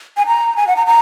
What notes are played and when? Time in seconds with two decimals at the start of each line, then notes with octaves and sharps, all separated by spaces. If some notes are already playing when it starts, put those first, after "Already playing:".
0.17 G#5
0.27 A#5
0.56 G#5
0.67 F#5
0.76 A#5
0.87 A#5